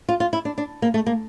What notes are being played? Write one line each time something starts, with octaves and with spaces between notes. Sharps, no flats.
F4
F4
E4
D4
D4
A#3
A3
A#3